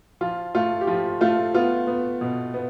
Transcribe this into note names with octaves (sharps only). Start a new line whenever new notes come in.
F3 F4
A3 F4
G4
F3 F4
A3 F4
B3 F4
B3
B2
B3